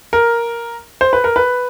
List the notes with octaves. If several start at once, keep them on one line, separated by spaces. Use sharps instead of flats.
A#4
C5
B4
A#4
B4